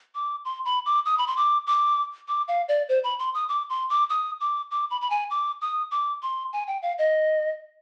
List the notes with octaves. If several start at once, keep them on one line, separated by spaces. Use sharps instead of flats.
D6
C6
B5
D6
D#6
B5
C6
D6
D6
D6
F5
D5
C5
B5
C6
D#6
D6
C6
D6
D#6
D6
D6
B5
B5
G#5
D6
D#6
D6
C6
G#5
G5
F5
D#5